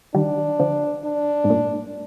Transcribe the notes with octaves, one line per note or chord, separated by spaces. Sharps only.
D#3 G3 D4
D3 F3
D4
G#2
G2 A#2